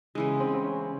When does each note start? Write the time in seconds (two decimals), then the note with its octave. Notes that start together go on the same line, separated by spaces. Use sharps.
0.15 C#3 E3 G#3
0.40 C4
0.54 C4
0.64 C#4